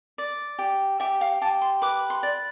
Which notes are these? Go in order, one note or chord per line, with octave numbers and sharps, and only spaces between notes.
D5
G4
G4 E5
F5
G4 A5
C6
B4 D6
C6
D5